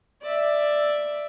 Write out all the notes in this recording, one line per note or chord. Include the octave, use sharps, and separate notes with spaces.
D5 E5